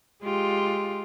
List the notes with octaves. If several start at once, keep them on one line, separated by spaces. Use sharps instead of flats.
G#3 F4 G4